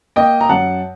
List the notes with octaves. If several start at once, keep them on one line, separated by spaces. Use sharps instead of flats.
A#3 D#5 G5
A#5
F#2 F#5 A5